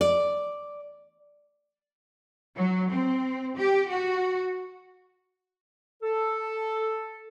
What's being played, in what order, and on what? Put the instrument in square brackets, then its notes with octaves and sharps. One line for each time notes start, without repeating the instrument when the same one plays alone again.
[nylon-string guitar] D5
[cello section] F#3
C4
G4
F#4
[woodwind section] A4